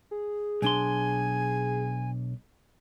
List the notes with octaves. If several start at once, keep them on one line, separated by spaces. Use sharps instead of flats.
G#4
B1 D4 G#5 C6